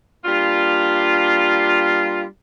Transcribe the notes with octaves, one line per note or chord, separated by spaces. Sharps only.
G3 A#3 D4 F4